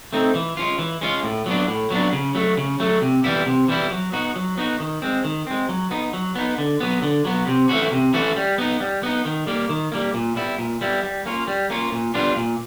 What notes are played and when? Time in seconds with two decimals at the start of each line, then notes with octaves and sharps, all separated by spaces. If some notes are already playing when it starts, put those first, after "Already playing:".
0.13 A3 C4 D#4
0.35 E3
0.57 G#3 C#4 F4
0.79 E3
1.01 G#3 C#4 F4
1.24 A2
1.46 F#3 B3 D4
1.68 A2
1.91 F#3 B3 D4
2.13 C#3
2.35 F#3 A3
2.57 C#3
2.80 F#3 A3
3.01 C3
3.24 E3 G3 B3 E4
3.46 C3
3.68 E3 G3 B3 E4
3.91 F#3
4.13 B3 D#4 F#4
4.36 F#3
4.58 B3 D#4 F#4
4.80 D#3
5.02 G#3 C4
5.24 D#3
5.47 G#3 C4
5.69 F#3
5.91 B3 D#4
6.13 F#3
6.35 B3 D#4
6.58 D3
6.80 F#3 B3
7.02 D3
7.25 F#3 B3
7.47 C3
7.69 E3 A3 C#4 F#4
7.92 C3
8.14 E3 A3 C#4 F#4
8.36 G3
8.58 B3 D#4
8.80 G3
9.03 B3 D#4
9.25 D#3
9.47 G3 A#3
9.69 D#3
9.92 G3 A#3
10.14 A#2
10.36 G3 B3 E4
10.58 A#2
10.81 G3 B3 E4
11.03 G3
11.25 A#3 C#4 F4
11.47 G3
11.70 A#3 C#4 F4
11.92 A#2
12.14 G3 B3 D4 F4
12.37 A#2